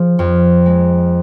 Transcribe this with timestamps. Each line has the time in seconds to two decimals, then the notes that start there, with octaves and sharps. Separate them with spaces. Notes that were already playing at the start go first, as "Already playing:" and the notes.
Already playing: F3 G#4
0.19 F2
0.66 G#3